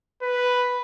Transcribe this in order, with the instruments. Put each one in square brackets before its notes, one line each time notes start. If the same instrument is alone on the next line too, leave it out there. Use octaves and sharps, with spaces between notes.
[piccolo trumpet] B4